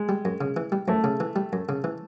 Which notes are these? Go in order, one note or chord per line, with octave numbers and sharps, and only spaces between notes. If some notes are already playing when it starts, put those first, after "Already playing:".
Already playing: G#3
G3
F#2
C#3
E3
G3
F#2 A3
C#3
E3
G3
F#2
C#3
E3